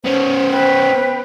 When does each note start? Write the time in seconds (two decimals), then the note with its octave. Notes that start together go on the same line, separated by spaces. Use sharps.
0.04 B3 C#4 C5
0.50 B4 G5